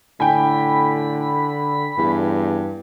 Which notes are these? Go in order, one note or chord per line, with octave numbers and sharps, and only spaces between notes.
A2 D3 G5 G#5 B5
E2 G2